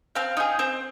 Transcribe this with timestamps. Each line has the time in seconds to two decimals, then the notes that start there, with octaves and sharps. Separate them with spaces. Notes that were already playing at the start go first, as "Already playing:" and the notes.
0.15 C4 F5
0.37 D#4 G#4
0.59 C4